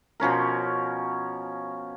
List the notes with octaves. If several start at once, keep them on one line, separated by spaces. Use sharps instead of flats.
B2 F3 C#4 A#4